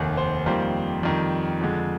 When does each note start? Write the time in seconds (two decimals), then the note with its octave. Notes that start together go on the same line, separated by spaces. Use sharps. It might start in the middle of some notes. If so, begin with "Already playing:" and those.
Already playing: F1 D#2 D#3
0.17 C5
0.46 F2 D#3 G3 A#3 C5
1.03 F2 D#3 G3
1.61 F2 D3 G#3